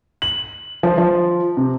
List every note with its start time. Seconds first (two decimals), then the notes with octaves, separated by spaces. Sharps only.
0.22 F#7
0.83 F3
0.98 F3
1.57 C3